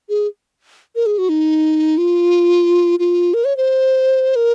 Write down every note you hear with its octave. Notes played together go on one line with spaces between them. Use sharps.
G#4
A#4
G#4
F#4
D#4
F4
F4
A#4
C#5
C5
A#4